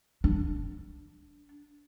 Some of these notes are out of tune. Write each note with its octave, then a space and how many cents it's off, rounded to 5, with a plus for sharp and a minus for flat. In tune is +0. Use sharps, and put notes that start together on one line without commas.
D4 -10